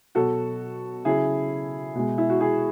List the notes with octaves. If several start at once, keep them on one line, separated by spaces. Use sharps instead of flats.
B2 F#3 F#4 A4
C#3 F#3 E4 G#4
B2 G#3
E4
F#4
E4 G#4